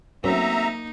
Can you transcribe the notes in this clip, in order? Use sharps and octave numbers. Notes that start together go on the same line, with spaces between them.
F#2 A3 A#3 C4 D#4 F#4 E5 A#5